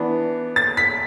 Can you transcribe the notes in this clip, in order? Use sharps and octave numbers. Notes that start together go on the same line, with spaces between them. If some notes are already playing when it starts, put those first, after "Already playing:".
Already playing: E3 B3 D4
A6
B6